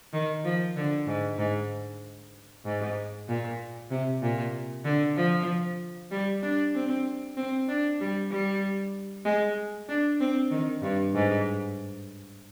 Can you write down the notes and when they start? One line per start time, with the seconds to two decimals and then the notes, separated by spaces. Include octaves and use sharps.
0.13 D#3
0.45 F3
0.77 D3
1.07 G#2
1.38 G#2
2.65 G#2
3.28 A#2
3.91 C3
4.22 A#2
4.85 D3
5.17 F3
6.12 G3
6.43 D4
6.75 C4
7.37 C4
7.69 D4
8.00 G3
8.31 G3
9.25 G#3
9.89 D4
10.21 C4
10.51 D#3
10.82 G2
11.15 G#2